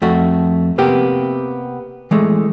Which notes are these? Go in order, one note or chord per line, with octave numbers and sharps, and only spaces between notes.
F2 A3 F#4
C3 A#3 B3 G4
E3 G#3 A3